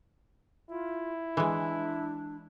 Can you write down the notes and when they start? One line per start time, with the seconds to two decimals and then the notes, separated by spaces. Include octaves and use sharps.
0.70 E4 F4
1.37 E3 G#3 D4